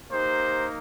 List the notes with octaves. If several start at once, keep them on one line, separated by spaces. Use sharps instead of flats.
A#3 D#4 G4 C5